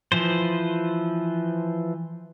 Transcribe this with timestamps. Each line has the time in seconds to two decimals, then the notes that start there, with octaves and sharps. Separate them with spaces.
0.12 E3 F3 C5